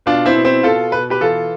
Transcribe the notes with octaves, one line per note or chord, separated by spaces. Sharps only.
B2 D4 F4
C4 E4
B2
C4 E4
B2 F4 A4
B2 B4
G4 B4
E3 F4 A4